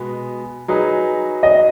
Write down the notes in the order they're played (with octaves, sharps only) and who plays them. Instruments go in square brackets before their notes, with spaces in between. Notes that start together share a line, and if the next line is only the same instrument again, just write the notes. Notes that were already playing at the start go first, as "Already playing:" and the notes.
Already playing: [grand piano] B2 G#3 B3
F#3 D#4 G#4 B4
[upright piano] D#5